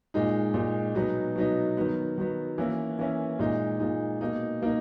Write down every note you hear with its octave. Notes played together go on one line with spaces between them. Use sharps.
A#2 G#3 D#4
A#2 G#3 D#4
B2 F#3 B3 D#4
B2 F#3 B3 D#4
D#3 F#3 B3
D#3 F#3 B3
E3 A#3 C#4 E4
E3 A#3 C#4 E4
A#2 G#3 D#4
A#2 G#3 D#4
B2 A#3 D#4
B2 A#3 D#4